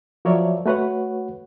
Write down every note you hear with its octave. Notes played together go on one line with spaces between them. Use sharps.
F3 F#3 A#4 C#5 D5 E5
A3 F#4 B4 C#5 F#5